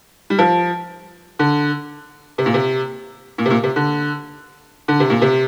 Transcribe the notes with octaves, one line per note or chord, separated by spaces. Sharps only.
G3
F3
D3
C3
A#2
C3
A#2
C3
A#2
C3
D3
D3
C3
A#2
C3